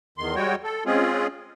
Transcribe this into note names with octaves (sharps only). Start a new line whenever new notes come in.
E2 D#3 C6
G3 G#3 F#4 C#5 G5
A4
G#3 C4 C#4 F4 G#4